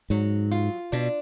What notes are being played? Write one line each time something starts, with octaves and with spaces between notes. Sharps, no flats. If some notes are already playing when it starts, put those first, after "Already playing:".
G#2 F#3
F4
B2 D4